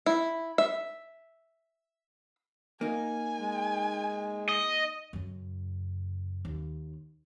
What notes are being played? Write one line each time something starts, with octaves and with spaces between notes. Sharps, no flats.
E4
E5
A#3 D#4 G#5
G#3
D#5
F#2 C#3
D#2